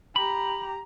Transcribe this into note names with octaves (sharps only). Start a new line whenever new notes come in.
G4 A#5 B5